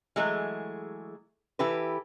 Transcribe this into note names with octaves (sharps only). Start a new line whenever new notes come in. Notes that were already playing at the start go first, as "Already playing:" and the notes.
E3 F#3 G#3 A3 G#4
E3 E4 G4 A4 B4